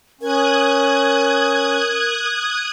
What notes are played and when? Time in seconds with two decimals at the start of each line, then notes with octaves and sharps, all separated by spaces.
0.21 C#4 A#4 D#6 F#6 G#6